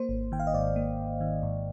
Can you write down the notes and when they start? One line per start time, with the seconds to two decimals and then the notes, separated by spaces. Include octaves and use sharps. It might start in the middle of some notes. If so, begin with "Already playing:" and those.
Already playing: A#3 C5
0.09 G#1
0.32 D#3 G5
0.40 F5
0.47 D#5
0.54 G#2 D5
0.76 A#3
0.98 G#1
1.21 D#3
1.43 G#2